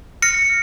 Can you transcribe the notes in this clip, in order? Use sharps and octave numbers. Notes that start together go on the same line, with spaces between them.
F6 A#6 C#7